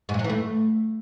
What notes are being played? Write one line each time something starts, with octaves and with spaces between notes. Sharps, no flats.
G#2
G2
F#3
E3
A3